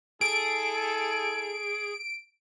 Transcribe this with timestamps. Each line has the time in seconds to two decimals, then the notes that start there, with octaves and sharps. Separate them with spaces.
0.21 E4 G#4 A4 D7